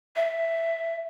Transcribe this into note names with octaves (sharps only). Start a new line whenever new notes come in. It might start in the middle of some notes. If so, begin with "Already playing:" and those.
E5